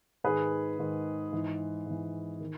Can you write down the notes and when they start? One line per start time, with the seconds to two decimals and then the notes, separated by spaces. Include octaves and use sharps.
0.24 G#2 D#3 G#4 B4
0.79 G#2 D#3
1.32 G#2 E3
1.86 G#2 E3
2.40 D#3